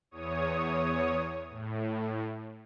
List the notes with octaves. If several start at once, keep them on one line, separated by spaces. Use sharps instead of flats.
E2 C#5 D#6
A2